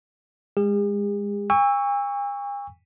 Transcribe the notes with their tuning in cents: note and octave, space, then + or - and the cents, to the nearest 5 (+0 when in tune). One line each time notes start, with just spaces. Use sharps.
G#3 -20 G#4 -45
G#5 -45 C#6 +10 E6 +0